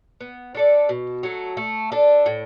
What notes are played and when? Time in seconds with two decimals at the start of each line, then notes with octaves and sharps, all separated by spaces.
0.21 B3
0.55 D4 A4 D5
0.89 B2
1.23 F#3 A3
1.57 A3
1.92 D4 A4
2.26 A2